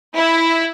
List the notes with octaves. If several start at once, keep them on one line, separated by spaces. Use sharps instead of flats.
E4